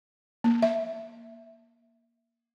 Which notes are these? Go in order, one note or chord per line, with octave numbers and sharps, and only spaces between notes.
A#3
E5